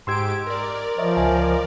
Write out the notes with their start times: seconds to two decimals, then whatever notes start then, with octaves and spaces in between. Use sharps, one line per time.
0.07 G#2 G4 C6 E6 G#6 D7
0.47 A#4 D5
0.98 F3 C#5 D#5 E5
1.17 C#2 C#5 G#5